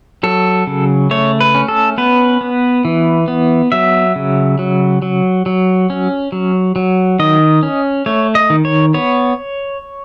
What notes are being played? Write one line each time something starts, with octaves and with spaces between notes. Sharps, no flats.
F#3 A4
C#3
A3 C#5
B4
C#4
A4
B3 B4
B3
E3
B3
F#3 E5
C#3
F#3
F#3
F#3
C#4
F#3
F#3
D#3 D#5
C#4
A3 C#5
D#5
D#3
C#5
B3 C#5